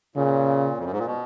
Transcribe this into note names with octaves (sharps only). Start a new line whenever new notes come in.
A#2 C#3
F2
F#2
G#2
A#2
B2